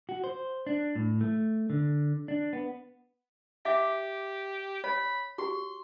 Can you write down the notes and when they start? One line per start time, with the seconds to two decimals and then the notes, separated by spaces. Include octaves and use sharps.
0.09 F#4
0.24 C5
0.67 D4
0.95 A2
1.21 A3
1.70 D3
2.28 D4
2.53 B3
3.65 G4 E5 F5 D6
4.84 C#5 B5
5.38 F#4 G4 C6